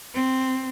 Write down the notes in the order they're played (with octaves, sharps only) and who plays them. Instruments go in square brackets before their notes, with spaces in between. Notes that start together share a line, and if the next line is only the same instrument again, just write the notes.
[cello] C4